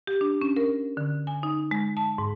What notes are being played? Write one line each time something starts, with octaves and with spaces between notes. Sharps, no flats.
G4
D4
C#4
A#4
D3
G#5
D#4
G#3
A5
G#2